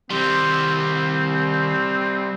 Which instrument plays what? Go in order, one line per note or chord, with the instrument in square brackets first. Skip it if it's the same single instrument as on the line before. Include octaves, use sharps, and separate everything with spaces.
[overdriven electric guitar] C3 G3 [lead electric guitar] D#3 C6 [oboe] C4